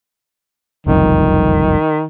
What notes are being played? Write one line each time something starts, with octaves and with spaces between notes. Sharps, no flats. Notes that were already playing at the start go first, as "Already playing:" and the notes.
F#1 C2 F2 D#3